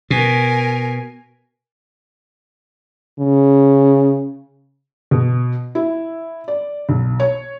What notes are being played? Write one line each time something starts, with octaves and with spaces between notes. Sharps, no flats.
B2 A#4 G#5
C#3
B2
E4
D5
B1
C#5